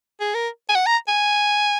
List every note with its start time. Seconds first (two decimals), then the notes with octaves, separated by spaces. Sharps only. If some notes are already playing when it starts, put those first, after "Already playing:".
0.20 G#4
0.35 A#4
0.69 G#5
0.75 F#5
0.86 A#5
1.08 G#5